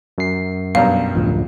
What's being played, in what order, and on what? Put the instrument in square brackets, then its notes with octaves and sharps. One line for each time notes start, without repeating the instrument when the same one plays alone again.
[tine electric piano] F#2 C7
[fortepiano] B1 G2 A#5 [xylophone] F5
[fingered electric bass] D2 A2 F3